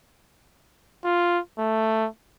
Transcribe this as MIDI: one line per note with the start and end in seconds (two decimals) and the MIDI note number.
1.05 1.39 65
1.59 2.07 57